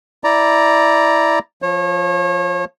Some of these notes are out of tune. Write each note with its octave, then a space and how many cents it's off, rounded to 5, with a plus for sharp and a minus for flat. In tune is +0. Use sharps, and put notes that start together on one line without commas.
E4 -10 D5 +0 A#5 +0
F3 +0 C#5 -35